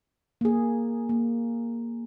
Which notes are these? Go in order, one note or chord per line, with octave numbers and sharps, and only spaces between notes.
A#3 G#4
A#3